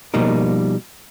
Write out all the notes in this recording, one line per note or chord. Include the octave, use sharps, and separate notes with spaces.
B2 F3 G3 A#3 D#4 A#4